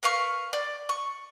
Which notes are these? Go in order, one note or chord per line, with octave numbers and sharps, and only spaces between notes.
A#4 B4 F5 C#6
D5
C#6